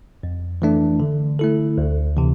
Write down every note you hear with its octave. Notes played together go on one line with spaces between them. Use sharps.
F2
E3 A3 D4
D3
A3 E4 A4
D2
C3 E3